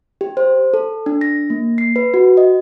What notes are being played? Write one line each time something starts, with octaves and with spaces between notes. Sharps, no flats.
G4
C5
A4
D4
A#6
A#3
C7
B4
F#4
D#5